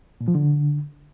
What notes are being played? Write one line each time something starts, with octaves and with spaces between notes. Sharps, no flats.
A#2
F3
D3